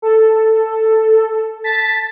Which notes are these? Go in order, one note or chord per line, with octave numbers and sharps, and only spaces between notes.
A4
A5 A6 B6